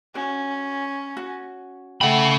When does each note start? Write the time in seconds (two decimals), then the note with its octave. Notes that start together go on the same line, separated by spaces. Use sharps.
0.15 C#4 F#4
1.17 F#4
2.01 C#3 A3 F#5 G5 B5